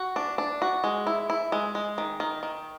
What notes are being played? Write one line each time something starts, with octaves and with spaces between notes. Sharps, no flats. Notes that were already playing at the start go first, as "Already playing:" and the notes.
Already playing: F#4
D4
D4
F#4
G#3
E4
E4
G#3
G#3
D#3
D#3
D#3